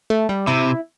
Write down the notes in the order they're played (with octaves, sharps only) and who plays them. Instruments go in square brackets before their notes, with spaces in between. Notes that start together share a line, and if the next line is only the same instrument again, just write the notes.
[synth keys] A3
G3
[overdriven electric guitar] C3 [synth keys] E4